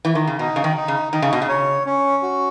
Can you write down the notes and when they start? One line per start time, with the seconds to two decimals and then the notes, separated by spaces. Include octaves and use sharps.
0.05 E3
0.15 D#3
0.27 C#3
0.39 B2 D#4
0.56 C#3
0.64 D#3
0.77 D#4
0.88 C#3
1.13 D#3 D#4
1.22 C#3
1.33 B2
1.42 C#3
1.49 C#5
1.86 C#4
2.23 F#4